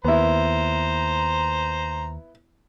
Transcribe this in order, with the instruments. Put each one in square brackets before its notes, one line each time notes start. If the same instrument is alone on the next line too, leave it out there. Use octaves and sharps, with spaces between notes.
[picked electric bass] D#2 [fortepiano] B3 E4 [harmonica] C5 A#5